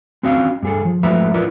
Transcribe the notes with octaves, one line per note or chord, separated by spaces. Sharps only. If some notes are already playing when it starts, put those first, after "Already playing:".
C4 C#4 F#4 D#5 F5
G2 G#4 A4
F3
G#2 F3 A3 B4 E5 A#5
E4 F4 A#4 B4 D5 D#5